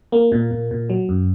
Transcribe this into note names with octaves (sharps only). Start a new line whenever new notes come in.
A#3
A#2
A#2
A#2
F#3
F#2